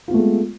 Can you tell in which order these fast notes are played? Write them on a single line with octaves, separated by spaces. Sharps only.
F4 B3 A3 G#3